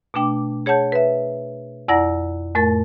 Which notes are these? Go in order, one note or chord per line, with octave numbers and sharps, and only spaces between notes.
B2 A3 D4 G5 D6
G#4 C#5 F#5 A5 G6
B4 E5
F2 E4 D5 F#5 A#5 A#6
F2 A2 A3 A#4 G#5 A6